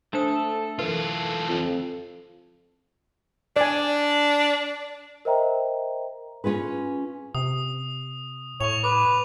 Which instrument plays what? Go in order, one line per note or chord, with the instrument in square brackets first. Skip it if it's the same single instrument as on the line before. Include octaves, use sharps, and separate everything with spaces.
[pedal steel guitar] A3 A4 [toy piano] D4 C5 D#6
[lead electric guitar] E3 F4 [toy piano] A#4 B4
[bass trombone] F2
[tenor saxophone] D4 [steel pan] D5 G#5
[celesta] A#4 C5 D#5 E5 G5 A#5
[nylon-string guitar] C#4 F4 G#4 B4
[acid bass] C3 [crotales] D#6
[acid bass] A2 [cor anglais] C#5 [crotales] C#6 F7
[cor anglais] B4 [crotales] D6